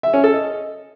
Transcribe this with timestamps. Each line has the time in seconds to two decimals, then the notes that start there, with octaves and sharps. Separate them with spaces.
0.03 E5
0.14 C#4
0.24 A4
0.34 D#5